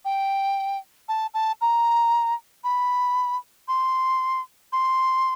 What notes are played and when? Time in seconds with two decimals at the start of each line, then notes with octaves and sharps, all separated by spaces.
0.05 G5
1.09 A5
1.34 A5
1.61 A#5
2.64 B5
3.68 C6
4.73 C6